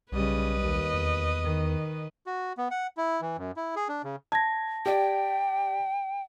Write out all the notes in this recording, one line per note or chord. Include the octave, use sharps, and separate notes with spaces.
B1 C#3 G3 B4 D#5
D#2
E2
D#3
F#4
B3
F#5
E4
E3
F#2
E4
G#4
D4
C#3
A5 G#6 A#6
G4 D5 G5